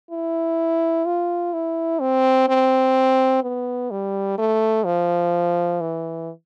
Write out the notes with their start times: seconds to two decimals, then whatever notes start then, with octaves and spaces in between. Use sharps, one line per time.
0.11 E4
1.06 F4
1.53 E4
2.00 C4
2.49 C4
3.42 B3
3.91 G3
4.38 A3
4.85 F3
5.81 E3